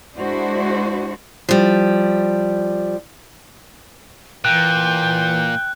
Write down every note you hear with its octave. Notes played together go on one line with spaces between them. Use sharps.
G#3 D4 E4 F#4 C5
F3 G3
A#2 E3 G5 F#6